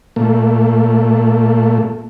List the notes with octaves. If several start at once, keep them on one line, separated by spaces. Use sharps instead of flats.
A#2 A3